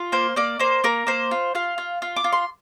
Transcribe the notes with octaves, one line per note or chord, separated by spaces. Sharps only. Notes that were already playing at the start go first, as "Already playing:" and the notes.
Already playing: F4
A#3 C5
A#3 D5
A#3 C5
A#3 A#4
A#3 C5
F4
F4 F5
F4
F4
D6
F4
C6